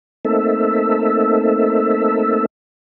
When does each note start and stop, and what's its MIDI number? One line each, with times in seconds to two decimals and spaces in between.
0.25 2.46 57
0.25 2.46 58
0.25 2.46 60
0.25 2.46 63
0.25 2.46 69
0.25 2.46 76